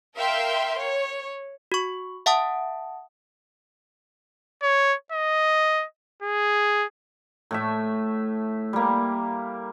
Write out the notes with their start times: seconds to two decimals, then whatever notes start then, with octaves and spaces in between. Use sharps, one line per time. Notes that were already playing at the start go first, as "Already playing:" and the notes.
0.17 A#4 E5 F5 G5 C6
0.81 C#5
1.72 F#4 C#6
2.26 E5 F#5 A5 D#6
4.63 C#5
5.12 D#5
6.23 G#4
7.51 A2 A3 E5
8.73 G3 A#3